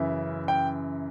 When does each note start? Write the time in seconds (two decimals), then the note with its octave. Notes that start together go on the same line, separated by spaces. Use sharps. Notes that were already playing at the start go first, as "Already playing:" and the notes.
Already playing: F#2 C#3 E3 E5
0.48 G5